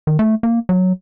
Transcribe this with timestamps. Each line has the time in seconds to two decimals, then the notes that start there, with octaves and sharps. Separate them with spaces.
0.07 D#3
0.19 A3
0.43 A#3
0.69 F#3